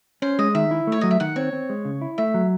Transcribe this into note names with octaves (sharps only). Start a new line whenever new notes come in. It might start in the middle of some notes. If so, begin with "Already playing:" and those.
C#4 C5
G#3 D#5
D#3 E5
E4
A3 C#5
F#3 D#5
E5
D#3 F#5
C4 C#5
C4
G#3
C#3
E4
A3 E5
F#3